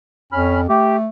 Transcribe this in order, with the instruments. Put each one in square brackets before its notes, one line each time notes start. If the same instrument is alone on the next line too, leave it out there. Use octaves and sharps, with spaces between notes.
[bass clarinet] F2 [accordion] C#4 B5 F6
[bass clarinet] A3 [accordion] G4